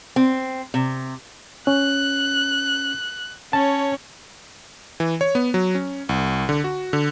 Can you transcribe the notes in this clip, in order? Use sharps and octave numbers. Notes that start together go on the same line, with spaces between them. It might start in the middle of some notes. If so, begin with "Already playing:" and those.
C4
C3
C#4 F#6
C#4 C#5 A5
E3
C#5
B3
F#3
C#4
C2
D3
F#4
D3